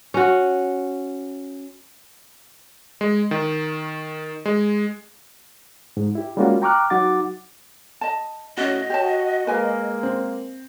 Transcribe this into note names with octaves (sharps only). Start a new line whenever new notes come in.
C#4 F#4
G#3
D#3
G#3
G#2
E4 G4
G3 G#3 A#3 C#4 F4 F#4
G5 A#5 C#6 D6 F6 F#6
F#3 D#4 F#4 F#5 D6 A6
D#5 A5
A2 C#4 F#4 D#5
F#4 G4 C#5 A5
G#3 A#3 B4 G#5
C4